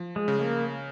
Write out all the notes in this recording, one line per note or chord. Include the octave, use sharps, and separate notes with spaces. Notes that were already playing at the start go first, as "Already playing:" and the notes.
Already playing: F3
G#3
C#3
A#3